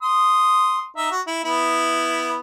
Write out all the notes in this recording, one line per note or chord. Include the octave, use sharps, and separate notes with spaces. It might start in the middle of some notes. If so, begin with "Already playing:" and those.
C6 D#6
D#4 E5
F#4
E4
B3 E4